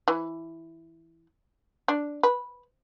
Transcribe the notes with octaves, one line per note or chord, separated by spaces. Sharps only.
E3
D4
B4